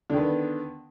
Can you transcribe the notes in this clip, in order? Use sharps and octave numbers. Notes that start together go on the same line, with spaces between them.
D3 D#3 B3